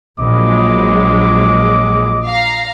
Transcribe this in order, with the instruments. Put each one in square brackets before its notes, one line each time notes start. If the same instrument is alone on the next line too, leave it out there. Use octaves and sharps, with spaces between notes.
[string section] A#1 F#3 G#3 [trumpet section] D#5 D6
[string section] F5 A#5